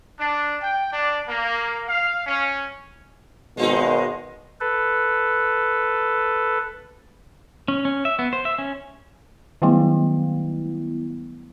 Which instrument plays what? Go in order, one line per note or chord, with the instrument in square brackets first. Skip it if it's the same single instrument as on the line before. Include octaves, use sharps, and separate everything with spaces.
[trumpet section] D4
G5
D4
A#3
F5
C#4
[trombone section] G#1 [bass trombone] B2 [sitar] G#3 C4 D#4
[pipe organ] A4 B4
[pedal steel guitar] C#4
C#4
E5
B3
C5
E5
C#4
[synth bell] D#3 F#3 G3 A3 B3 E4